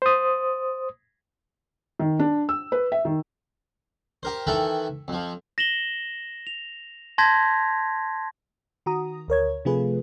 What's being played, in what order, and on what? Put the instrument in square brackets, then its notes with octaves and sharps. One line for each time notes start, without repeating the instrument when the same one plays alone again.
[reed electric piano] C5 D#6
[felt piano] D#3
D4
E6
B4
E5
D#3
[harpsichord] G4 A#4 C5
D#3 E3 A4 E5 G5 A5
F2 F3
[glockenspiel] A#6 E7 F#7 G7
F7
A5 C6 G6 G#6 A#6 B6
[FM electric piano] D#3 F#4 A#5 D#6
D2 A#4 C#5 G#6
C3 F3 A3 F4 G#4 B4